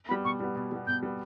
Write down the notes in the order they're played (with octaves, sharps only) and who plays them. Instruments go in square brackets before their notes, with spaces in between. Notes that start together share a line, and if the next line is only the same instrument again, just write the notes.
[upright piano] G3 B3 [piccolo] B5
[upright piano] B2 [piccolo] C#6
[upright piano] G3 B3
B2
G3 B3
[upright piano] B2 [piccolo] G6
[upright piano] G3 B3